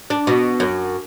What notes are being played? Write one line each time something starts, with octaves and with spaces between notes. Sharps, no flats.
D4
B2
F#2